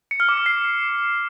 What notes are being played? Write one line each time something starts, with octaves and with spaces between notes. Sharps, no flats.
C#7
F6
D6
C#7
C7